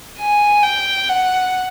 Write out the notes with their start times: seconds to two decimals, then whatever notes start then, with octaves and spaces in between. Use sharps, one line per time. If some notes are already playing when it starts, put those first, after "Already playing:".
0.19 G#5
0.63 G5
1.09 F#5